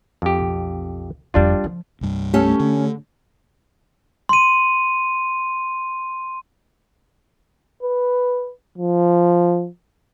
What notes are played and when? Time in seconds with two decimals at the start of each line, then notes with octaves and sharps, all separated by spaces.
0.22 F2 G4
0.39 B1
1.34 F#1 F2 G3 D4 F4
1.64 F3
2.01 C2 G2
2.34 A3 C#4 G4 A4
2.60 D3
4.29 C6 D#7
7.83 B4
8.78 F3